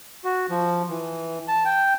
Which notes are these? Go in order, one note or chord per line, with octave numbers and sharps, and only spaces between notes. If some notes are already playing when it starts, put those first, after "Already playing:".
F#4
F3
E3
A5
G5